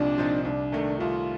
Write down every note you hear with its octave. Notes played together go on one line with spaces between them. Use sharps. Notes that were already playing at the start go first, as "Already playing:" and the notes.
Already playing: C2 A#2 F3 C4 D4 D#4
A#2 F3 C4 D#4
C2 D4
C3 D#3 A3
C2 F4